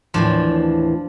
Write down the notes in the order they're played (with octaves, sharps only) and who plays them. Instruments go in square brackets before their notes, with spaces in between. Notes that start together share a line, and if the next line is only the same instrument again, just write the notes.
[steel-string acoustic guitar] D#2 A2 E3 [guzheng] F3 D4 F4